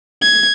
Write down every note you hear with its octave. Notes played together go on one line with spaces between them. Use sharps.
G#6